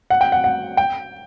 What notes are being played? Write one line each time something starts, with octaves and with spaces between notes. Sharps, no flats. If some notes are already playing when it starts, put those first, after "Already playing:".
F#5
G5
F#5
F#5
G5